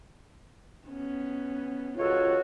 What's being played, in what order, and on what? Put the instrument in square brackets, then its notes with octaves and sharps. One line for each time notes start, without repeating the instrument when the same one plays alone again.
[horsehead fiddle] B3 C#4
[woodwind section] C#2 A4 C#5 [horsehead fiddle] F4 F#4